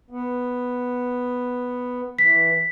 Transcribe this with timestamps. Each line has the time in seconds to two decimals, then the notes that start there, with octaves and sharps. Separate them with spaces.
0.10 B3
2.19 E3 B6